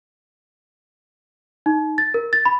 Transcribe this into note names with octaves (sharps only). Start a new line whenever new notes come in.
D#4
A6
A#4
A6
B5